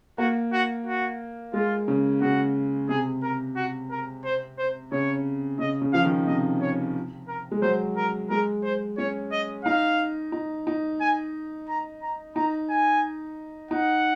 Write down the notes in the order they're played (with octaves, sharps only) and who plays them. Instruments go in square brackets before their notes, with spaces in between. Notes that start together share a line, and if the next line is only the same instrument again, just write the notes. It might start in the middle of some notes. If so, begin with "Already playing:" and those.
[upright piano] A#3 [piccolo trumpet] F#4
[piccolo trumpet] F#4
F#4
[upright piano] G#3 [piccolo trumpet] F4
[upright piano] C#3
[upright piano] C#3 [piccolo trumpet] F#4
[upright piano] C3 [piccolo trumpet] G#4
[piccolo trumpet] A#4
F#4
A#4
C5
C5
[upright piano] C#3 [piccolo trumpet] C#5
[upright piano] C#3 [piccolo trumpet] D#5
[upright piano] C#3
[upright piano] F3 [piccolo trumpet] F5
[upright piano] D#3
[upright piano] C3 [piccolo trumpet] D#5
[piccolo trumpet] C#5
A#4
[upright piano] G#3
[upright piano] F#3 [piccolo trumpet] C5
[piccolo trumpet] A#4
[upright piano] G#3 [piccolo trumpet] A#4
[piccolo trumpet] C5
[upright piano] C#4 [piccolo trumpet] C#5
[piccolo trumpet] D#5
[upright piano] D#4 [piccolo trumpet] F5
[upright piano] D#4
D#4
[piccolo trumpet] G#5
A#5
A#5
[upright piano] D#4 [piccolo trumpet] A#5
[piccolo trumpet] G#5
[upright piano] D#4 [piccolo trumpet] F#5